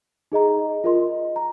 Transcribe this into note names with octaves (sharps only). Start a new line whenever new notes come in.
D#4 G#4 D#5 A#5
F4 A#4 D#5 C6
A#5